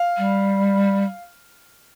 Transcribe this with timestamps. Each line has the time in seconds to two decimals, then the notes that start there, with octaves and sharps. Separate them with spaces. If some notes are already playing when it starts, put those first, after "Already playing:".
Already playing: F5
0.17 G3